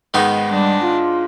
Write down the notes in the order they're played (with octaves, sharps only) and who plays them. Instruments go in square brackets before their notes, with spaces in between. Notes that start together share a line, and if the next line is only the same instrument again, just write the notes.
[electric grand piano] G#2 G#3 [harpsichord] D#3 B3 D#4
[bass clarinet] G3 [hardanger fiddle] D4
[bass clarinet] F4